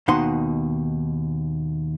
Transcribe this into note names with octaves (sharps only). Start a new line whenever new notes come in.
D#2 B2 D#4 F#5 C6